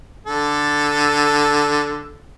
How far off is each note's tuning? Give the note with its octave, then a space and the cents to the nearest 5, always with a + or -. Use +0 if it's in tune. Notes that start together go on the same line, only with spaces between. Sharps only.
D3 +0 A4 +0